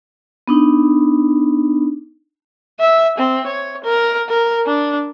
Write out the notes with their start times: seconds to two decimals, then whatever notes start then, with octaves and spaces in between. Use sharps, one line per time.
0.48 B3 D4 D#4
2.80 E5
3.18 C4
3.47 C#5
3.84 A#4
4.29 A#4
4.66 D4